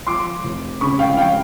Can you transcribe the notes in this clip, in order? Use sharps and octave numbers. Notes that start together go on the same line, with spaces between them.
F3 C6 D6
F1
C#3 B5 C#6
F5 G5
F5 G5